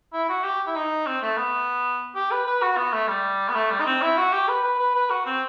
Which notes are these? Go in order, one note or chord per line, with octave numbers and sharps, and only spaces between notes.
E4
F#4
G4
E4
D#4
C4
A3
B3
G4
B4
B4
F#4
B3
A3
G3
B3
A3
G3
D#4
C4
E4
F#4
G4
B4
B4
B4
B4
F#4
C4